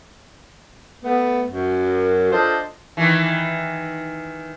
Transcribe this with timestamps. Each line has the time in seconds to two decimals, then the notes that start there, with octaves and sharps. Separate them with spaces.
1.03 A3 B3
1.50 F#2
2.31 D4 F4 A4 C5 D#5
2.97 D#3 E3